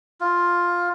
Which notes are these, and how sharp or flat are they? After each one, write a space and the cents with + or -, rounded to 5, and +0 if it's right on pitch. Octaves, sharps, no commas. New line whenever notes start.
F4 +5